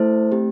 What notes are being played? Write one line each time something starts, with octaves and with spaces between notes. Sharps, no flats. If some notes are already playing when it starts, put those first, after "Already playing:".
Already playing: A3 E4 A4 C5
A3 C4 G4